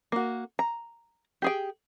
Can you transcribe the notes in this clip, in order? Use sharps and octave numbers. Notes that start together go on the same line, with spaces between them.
A#3 F#4
A#5
G4 G#4 G5